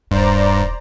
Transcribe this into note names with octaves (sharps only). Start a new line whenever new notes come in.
D#1 G2 D#4 C5 D5 A#5